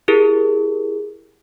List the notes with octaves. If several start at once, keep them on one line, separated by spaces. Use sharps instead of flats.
E4 G4 G#4 A#4